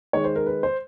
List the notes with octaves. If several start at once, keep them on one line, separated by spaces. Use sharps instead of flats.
D#3 G#3 C#5
C5
A#4
B4
C5